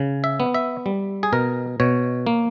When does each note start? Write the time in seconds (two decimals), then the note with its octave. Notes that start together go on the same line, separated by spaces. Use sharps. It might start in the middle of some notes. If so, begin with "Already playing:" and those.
Already playing: C#3
0.24 E5
0.40 B3
0.54 E5
0.86 G3
1.23 G#4
1.33 B2 A#4
1.80 B2 C#5
2.27 A#3